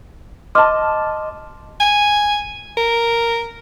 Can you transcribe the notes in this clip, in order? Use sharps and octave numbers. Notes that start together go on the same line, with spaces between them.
D#5 A5 C6 D6 F6
G#5
A#4